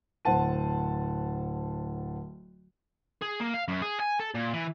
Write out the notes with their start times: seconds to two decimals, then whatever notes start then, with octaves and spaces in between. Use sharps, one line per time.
0.25 D1 C5 F#5 A5 D#7
3.22 G#4
3.40 A#3
3.54 F5
3.68 F#2
3.82 G#4
4.00 G#5
4.20 A4
4.35 A#2
4.54 E3